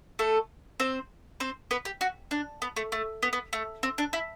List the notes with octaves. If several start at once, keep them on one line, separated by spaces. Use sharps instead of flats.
A3 A4
C4 C5
C4 C5
B3 B4
G4
F#4
D4
B3
A3
A3
B3
B3
A3
C4
D4
E4